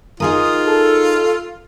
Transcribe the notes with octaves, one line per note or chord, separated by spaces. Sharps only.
D#4 F4 G#4 A#4 D#6
A4